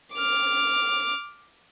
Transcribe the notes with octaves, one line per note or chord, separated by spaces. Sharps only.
D6 F6